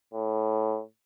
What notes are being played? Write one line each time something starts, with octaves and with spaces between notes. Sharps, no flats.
A2